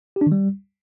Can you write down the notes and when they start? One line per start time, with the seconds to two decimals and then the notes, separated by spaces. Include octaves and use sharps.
0.16 G4
0.21 D4
0.27 D#3
0.32 G3